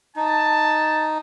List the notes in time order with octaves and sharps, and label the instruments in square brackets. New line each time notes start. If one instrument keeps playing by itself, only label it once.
[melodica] D#4 [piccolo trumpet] A5